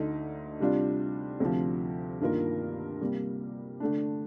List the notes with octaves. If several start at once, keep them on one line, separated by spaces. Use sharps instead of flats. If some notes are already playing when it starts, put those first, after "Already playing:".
Already playing: D2 D3 A3 D#4
C3 G3 D4 F4
D2 C3 F3
G2 D#3 A#3 F4 A#4
C3 G3 A#3
D3 A3 D4